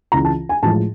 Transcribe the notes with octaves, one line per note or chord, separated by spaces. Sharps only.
C#2 C#3 E3 A#5
A5
G#5
A2 F3 G#3 A5